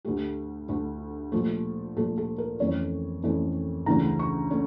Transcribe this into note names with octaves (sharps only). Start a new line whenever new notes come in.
D2 D3 A3 G4
D2 D3 A3
A#2 F3 A3
A#2 F3 A3 A4
A4
A#4
F2 E3 A3 C#4 C#5
F2 E3 A3 C#4
D2 C#3 E3 A3 C#4 A#5
C#6
A3 C#4